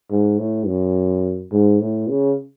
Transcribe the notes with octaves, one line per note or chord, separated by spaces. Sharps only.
G#2
A2
F#2
G#2
A2
C#3